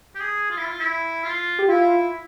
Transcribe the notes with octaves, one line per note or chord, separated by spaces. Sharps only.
G4
G#4
F4
E4
F4
E4
F4
G4
E4 F4